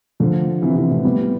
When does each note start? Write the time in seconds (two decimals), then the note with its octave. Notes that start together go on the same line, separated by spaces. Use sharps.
0.20 D3 F3
0.62 C3 E3
0.75 C3 E3
0.90 A2 C3
1.03 G3 B3